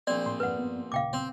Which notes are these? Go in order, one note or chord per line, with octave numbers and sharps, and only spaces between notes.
A#1 C4 D5
A2 C6
F2 G#2 B4 F#5
G2 B3
D#2 A#2 C#3 F5 G5 D6
C4